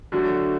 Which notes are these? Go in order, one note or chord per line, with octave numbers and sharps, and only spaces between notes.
D3 F#3 A3 F#4